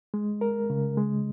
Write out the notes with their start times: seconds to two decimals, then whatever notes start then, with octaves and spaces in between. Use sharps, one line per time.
0.14 G#3
0.41 A#4
0.70 C#3
0.98 G#3